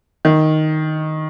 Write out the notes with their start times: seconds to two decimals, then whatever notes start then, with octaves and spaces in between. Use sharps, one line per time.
0.25 D#3